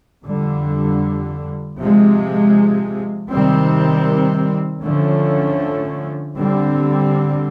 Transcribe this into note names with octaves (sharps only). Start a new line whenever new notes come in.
F2 D3 G3
C3 F3 G#3
C3 D#3 G3 C4
D3 F3 A3 C#4
D3 G3 C4